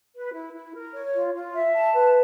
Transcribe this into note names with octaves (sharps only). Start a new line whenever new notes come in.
B4
E4
E4
A#4
C#5
F4
F4
E5
A5
B4